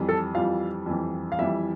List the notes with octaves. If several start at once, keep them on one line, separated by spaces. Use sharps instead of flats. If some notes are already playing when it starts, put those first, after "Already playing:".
Already playing: F2 E3 G3
A4 A5
F2 E3 G3 F4 F5
F2 E3 G3
F5
F2 E3 G3 E4 E5